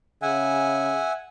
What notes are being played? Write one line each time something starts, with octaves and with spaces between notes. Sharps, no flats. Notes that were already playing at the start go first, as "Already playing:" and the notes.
C#3 E5 F#5 G#5